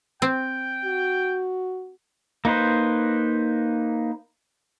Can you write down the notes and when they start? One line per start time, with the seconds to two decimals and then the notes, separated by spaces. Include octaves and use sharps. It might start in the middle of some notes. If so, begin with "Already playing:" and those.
0.22 C4 G5
0.85 F#4
2.45 A#3 D#4 B4 C5